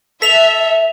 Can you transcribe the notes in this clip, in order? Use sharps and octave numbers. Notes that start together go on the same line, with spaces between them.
A4 E5 B6 F7